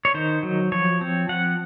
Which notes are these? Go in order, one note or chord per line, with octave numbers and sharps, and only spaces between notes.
C#5
D#3 C5
F#3
F3 C#5
C4
F3 F#5